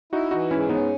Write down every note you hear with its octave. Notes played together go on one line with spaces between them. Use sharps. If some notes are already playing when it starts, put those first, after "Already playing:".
D#4 E4 F#4
E3 D#4 F#4
G#2 C#4 E4
B3 C#4 D#4